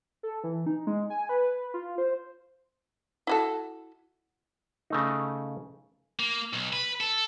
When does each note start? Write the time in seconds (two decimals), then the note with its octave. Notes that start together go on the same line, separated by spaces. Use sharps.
0.23 A4
0.44 E3
0.66 D#4
0.87 G#3
1.10 G#5
1.29 B4
1.74 F4
1.98 C5
3.27 E4 F#4 A4
4.90 C#3 A3 D#4
6.20 A#3
6.53 B1
6.73 B4
7.00 A4